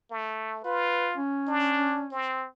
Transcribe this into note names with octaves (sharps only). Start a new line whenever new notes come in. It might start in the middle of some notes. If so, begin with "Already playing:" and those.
A3
F4 B4
C#4
D4
C4